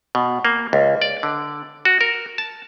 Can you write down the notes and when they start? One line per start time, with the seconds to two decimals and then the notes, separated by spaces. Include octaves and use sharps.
0.15 B2
0.45 A#3
0.73 C#2
1.02 D5
1.23 D3
1.85 F#4
2.01 A#4
2.38 A5